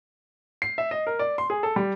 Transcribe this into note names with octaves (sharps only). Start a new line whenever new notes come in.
C7
E5
D#5
A#4
D5
C6
G#4
A4
G3